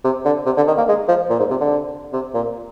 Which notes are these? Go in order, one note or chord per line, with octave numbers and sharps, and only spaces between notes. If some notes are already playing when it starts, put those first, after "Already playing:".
C3
D3
C3
D3
D#3
A#3
G#3
F3
A#2
G#2
C3
D3
C3
A#2